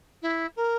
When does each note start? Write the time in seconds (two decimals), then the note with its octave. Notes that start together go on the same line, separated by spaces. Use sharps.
0.22 E4
0.56 A#4